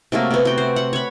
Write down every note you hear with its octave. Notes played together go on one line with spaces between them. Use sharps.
C3 F#3 A3 A#3
C3 B3
F#4 G5
C5
F#5
C#5 B5